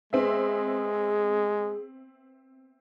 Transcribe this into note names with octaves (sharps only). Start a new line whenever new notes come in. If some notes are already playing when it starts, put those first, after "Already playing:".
G#3 B3 C4 G#4 E5